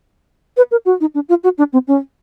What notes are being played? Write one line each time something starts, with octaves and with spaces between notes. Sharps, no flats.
B4
A#4
F#4
D#4
D4
F4
F#4
D4
C4
C#4